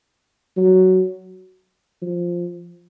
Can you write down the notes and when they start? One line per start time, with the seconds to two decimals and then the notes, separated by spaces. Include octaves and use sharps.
0.57 F#3
2.02 F3